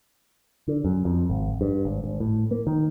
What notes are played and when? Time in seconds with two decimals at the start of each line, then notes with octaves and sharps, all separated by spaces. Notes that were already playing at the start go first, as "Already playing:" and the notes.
0.68 D3
0.85 F#2
1.05 F2
1.30 G#1
1.61 G2
1.85 G#1
2.04 G#1
2.20 A2
2.51 A#3
2.67 D#3